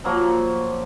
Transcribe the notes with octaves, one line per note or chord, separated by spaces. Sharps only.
F3 F#3 A#3